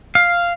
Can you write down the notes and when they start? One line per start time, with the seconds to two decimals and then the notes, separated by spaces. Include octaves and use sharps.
0.15 F5